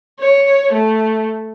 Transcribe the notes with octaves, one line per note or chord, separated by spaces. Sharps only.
C#5
A3